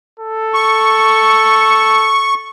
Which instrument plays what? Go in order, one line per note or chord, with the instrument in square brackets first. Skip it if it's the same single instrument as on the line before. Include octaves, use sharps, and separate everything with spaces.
[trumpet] A4
[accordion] C#6